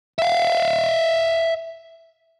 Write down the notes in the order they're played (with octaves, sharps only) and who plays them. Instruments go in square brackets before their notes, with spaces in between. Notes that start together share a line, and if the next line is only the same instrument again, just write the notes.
[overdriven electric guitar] E5 F5